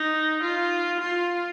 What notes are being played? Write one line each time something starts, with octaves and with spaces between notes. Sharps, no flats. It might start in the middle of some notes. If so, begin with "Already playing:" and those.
Already playing: D#4
F4
F4